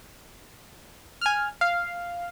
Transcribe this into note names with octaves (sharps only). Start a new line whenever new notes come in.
G#5 F6
F5